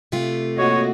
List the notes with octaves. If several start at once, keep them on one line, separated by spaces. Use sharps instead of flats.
C3 A3 F4
A#3 F#4 C#5 D#5